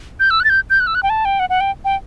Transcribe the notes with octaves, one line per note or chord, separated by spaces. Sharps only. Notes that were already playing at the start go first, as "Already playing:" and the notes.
G6
E6
F#6
A6
G6
G6
F#6
E6
F#6
G5
A5
G5
F#5
F#5
G5
G5